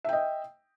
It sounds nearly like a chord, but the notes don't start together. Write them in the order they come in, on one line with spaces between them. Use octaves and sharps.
E5 G5 D#5